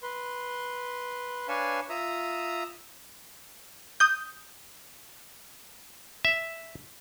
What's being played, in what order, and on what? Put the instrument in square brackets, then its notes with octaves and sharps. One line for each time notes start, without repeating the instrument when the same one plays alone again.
[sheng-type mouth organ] B4 C6
D4 B4 C#5 F5 G#5 A5
F4 E5 A#5 D#6
[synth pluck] D#6 G6
[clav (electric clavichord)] E5